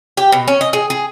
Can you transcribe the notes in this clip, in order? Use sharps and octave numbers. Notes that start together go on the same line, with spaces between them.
G4
B2
C#4
D#5
G#4
G#4